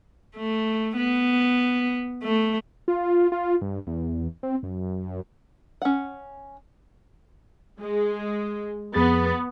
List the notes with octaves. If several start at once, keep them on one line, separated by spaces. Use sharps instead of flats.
A3
B3
A3
F4
F4
G2
E2
C4
F#2
C#4 F#5
G#3
F2 B3 G#4 A6